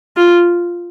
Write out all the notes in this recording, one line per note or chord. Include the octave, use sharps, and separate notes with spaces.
F4